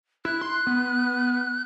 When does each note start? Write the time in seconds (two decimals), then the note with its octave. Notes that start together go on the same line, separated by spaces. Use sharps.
0.25 E4 F#6
0.41 C6
0.67 B3